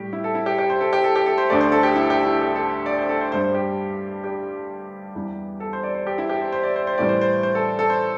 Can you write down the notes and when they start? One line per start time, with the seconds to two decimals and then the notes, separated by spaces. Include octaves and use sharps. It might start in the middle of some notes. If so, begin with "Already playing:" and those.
Already playing: A2 G3 G4
0.13 E4
0.24 A4
0.35 E4
0.46 G4
0.58 G4
0.70 C5
0.81 A4
0.93 G4
1.04 A4
1.16 G4
1.26 A4
1.38 C5
1.50 D2 D3 A3 D5
1.61 C5
1.72 A4
1.83 G4
1.96 E4
2.10 G4
2.26 E4
2.41 G4
2.55 A4
2.86 D5
2.98 C5
3.09 A4
3.21 C5
3.32 G2 G3 C5
3.44 C5
3.55 G4
4.24 G4
5.15 E2 E3 G3
5.60 A4
5.73 C5
5.83 D5
5.95 C5
6.07 G4
6.18 E4
6.29 G4
6.41 C5
6.52 C5
6.63 D5
6.76 C5
6.87 C5
6.98 A2 E3 G3 D5
7.09 C5
7.21 C5
7.43 C5
7.55 A4
7.79 A4
7.90 C5